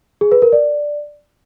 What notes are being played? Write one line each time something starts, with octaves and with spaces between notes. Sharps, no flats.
G#4
B4
A#4
D5